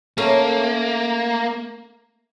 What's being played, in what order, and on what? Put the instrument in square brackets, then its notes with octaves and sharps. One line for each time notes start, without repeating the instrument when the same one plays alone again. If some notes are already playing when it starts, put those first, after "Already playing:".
[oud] A3 C#4 [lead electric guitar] A#3